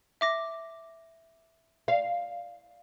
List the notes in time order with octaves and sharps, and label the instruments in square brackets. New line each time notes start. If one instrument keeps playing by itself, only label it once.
[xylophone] E5 D6 A#6
[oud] F5